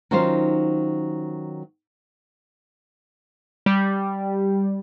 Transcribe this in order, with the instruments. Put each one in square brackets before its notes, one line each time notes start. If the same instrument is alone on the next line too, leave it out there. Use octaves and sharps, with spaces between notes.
[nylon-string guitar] D#3 F#3 C#4 D#4 F4 C5
[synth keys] G3